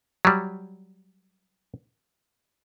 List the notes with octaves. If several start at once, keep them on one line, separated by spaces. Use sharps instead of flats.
F#3 G3